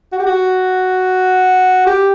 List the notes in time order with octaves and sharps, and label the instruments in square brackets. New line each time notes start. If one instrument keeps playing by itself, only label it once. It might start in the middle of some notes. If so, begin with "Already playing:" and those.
[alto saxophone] F#4
G4
F#4
G4